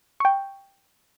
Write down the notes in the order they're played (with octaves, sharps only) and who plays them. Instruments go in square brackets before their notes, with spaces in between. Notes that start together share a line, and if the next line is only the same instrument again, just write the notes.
[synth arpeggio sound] G5 C#6